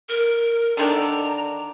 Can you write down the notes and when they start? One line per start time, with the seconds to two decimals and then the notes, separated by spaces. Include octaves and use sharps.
0.09 A#4
0.77 D3 D#3 D4 A#5